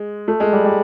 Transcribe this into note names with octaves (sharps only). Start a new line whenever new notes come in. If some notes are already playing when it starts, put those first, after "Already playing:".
Already playing: G#3
A3
G#3
G3
G3